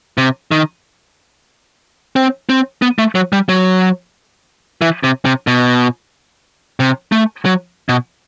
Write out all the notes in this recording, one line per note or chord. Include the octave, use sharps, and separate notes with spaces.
C3
D#3
C4
C4
B3
A3
F#3
G3
F#3
E3
C3
C3
B2
C3
A3
F#3
B2